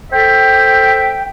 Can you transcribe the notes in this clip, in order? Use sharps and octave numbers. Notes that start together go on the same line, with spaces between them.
A4 C5 E5 G5